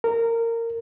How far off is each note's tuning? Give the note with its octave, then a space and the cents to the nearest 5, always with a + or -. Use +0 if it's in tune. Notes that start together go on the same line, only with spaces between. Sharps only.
A#4 -20